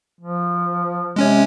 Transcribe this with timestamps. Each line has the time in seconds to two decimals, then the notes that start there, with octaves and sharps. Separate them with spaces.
0.21 F3
1.16 C3 G#3 C#4 C#5